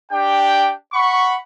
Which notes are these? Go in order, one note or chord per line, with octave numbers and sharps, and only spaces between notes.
D4 G4 G5
F#5 B5 C#6